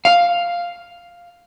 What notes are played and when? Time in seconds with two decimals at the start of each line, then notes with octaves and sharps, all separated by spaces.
0.05 F5